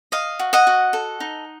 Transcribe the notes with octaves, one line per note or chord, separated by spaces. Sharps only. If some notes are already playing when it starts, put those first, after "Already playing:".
D#5 F5
F#4
D#5 F#5
F#4
A4
D#4